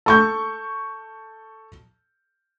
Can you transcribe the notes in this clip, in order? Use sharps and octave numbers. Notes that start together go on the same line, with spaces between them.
A4 C#6 G6